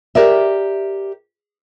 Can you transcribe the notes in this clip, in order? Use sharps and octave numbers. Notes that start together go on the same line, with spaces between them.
G4 A#4 D5 E5